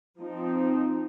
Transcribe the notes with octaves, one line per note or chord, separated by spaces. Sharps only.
F3 C4 D#4